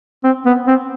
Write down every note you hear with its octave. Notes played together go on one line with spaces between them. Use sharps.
C4
B3
C4